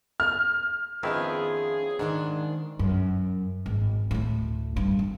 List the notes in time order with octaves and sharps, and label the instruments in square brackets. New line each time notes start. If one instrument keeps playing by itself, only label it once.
[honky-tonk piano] F6
[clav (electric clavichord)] F2 D#3 E4 [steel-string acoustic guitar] B3 C#4 F4 [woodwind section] G#4
[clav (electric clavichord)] G#2 [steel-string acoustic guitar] D#3 G#3 D4
[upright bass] F#2
G#1
D2 A2
G2
D3